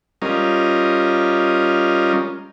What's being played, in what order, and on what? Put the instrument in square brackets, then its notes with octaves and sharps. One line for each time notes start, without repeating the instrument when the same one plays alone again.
[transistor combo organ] G3 C#4 F4 A#4 D#5